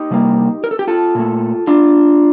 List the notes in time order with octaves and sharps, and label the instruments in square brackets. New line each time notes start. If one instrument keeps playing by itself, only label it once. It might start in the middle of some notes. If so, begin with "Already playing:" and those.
Already playing: [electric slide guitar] D#4 G4
C3 G3 A#3
A#4
A4
G4
F4 A4
A#2 A3
D4 F4